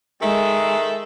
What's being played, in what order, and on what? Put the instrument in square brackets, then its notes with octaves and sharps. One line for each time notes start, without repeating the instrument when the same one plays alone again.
[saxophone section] D#3 A4 E5 [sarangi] G#3